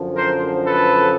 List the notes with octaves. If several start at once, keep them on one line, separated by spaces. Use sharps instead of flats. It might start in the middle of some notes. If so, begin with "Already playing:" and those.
Already playing: F#2 D3 F3
A#4 C5
A4 B4